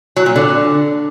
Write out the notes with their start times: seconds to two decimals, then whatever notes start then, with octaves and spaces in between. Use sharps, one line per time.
0.16 F#3
0.26 A#2
0.36 D3